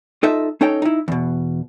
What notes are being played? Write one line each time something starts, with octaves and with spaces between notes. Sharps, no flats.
D#4 F4 A4 D#5 E5
C#4 D#4 A4 C#5 G5
D#4 E4
E2 B2